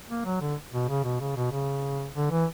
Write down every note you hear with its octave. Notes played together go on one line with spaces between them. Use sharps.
A#3
F#3
D3
B2
C#3
B2
C#3
B2
C#3
D3
E3